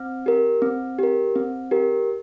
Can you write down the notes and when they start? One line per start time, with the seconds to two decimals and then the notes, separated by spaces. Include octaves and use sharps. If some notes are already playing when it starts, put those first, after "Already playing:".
Already playing: C4
0.26 G4 A#4
0.62 C4
0.99 G4 A#4
1.36 C4
1.71 G4 A#4